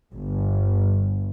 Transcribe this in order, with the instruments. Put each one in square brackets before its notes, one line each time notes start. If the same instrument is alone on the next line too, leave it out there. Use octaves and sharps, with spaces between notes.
[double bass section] G1